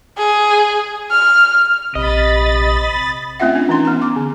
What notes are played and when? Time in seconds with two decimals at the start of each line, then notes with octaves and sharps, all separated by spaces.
0.17 G#4
1.11 F6
1.95 A#1 C3 D#5 B5 A6
3.40 A3 C4 C#4 F4 E5 F#5
3.55 D4
3.69 E3 C#4 D#4 C6
3.85 B3 A#5
4.02 D6
4.16 D3